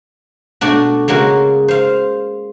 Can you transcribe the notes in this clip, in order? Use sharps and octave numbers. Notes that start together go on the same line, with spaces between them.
B2 A3 D4 F#4
C#3 G#3 A#3 F#4
C5 F5